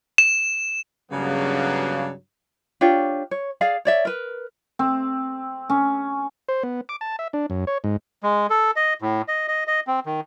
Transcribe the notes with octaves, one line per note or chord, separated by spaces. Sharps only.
E7
G2 C#3 F#3 A#3 B3 D4
D4 F4 G4 C#5
C#5
G#4 D5 F5
C#5 D5 E5
A#4 B4
C4
C#4
C5
B3
D6
A5
E5
D4
F#2
C#5
G#2
G#3
A4
D#5
A2
D#5
D#5
D#5
C4
D#3